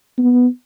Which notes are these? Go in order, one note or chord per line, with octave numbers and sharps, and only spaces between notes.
B3